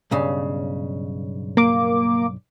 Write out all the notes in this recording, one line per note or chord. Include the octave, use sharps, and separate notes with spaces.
B1 G2 C#3
A#3 D6